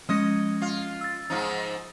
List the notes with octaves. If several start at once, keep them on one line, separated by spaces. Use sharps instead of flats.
F3 G#3 C#4 D#5
F4
E6 A6
G#2 F3 D#4